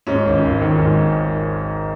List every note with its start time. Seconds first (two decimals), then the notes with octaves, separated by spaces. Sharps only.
0.07 G#2 C#4
0.25 G#1
0.43 G#1
0.61 D#3
0.79 G#2